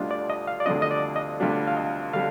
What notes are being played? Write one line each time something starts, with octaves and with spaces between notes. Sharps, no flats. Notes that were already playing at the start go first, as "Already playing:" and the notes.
Already playing: D2 D3 G3 D4 F4 D#5
D5
D#5
F5
D5
D2 D3 G3 D4 F4 D#5
D#5
D5
D#5
D2 D3 G3 D4 F4
F5
D#5
D3 G3 F5